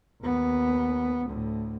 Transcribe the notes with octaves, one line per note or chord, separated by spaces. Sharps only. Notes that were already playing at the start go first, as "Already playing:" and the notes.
D#2 B3
D2 A2